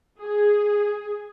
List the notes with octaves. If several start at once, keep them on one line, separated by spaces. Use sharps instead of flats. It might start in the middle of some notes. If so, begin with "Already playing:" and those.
G#4